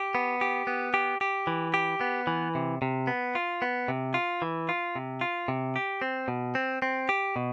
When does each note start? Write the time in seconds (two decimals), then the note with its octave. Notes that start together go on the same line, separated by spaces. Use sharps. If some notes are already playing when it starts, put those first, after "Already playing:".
Already playing: G4
0.15 B3
0.41 G4
0.67 B3
0.94 G4
1.21 G4
1.47 E3
1.74 G4
2.01 B3
2.27 E3
2.55 C3
2.82 C3
3.07 B3
3.35 F4
3.62 B3
3.88 C3
4.14 F4
4.42 E3
4.69 F4
4.96 C3
5.21 F4
5.48 C3
5.76 G4
6.02 C4
6.28 B2
6.55 C4
6.82 C4
7.09 G4
7.36 B2